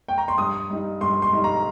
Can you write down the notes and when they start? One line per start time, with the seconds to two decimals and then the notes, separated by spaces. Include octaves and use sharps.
0.08 G5
0.18 A#5
0.28 C6
0.38 G2 D#6
0.70 G3 D#4
1.01 G2 C6
1.22 C6
1.32 G3 D#4
1.44 A#5